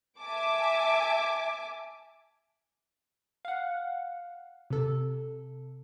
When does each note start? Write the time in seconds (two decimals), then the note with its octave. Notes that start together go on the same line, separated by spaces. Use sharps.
0.19 E5 G#5 A5 D6
3.45 F5 F#5
4.70 C3 A4